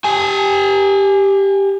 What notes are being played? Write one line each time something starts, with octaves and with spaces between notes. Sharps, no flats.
G4 G#5